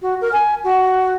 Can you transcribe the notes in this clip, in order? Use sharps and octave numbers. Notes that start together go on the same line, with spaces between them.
F#4
A#4
G#5
F#4